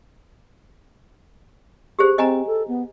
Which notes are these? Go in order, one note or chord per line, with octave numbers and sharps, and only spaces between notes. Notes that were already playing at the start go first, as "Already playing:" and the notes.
G4 G#4 C5
C4 D#5 G#5 A#5
A4
B3